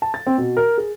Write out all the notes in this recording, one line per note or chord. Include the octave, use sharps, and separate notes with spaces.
A5
A6
C4
B2
A#4
G#4